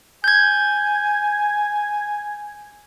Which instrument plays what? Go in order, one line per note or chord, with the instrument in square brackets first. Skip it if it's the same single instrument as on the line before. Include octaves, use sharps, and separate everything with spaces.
[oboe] G#5 [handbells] G6 G#6